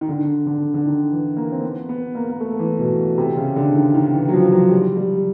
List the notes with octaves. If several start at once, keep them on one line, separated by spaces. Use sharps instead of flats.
D#3
D3
D3
D3
D#3
E3
A#3
C4
B3
B3
A#3
A#3
A3
E3
B2
C3
C#3
D3
D#3
D#3
E3
F#3
F3
F#3
G3
G3